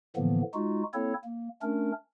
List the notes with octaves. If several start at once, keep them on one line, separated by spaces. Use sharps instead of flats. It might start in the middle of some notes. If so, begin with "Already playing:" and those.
A2 D3 E3 F3 A#3 B3
G#3 D#4 F4 F#4
A#3 C4 E4 A4 C#5
A#3
A3 C#4 D4 A#4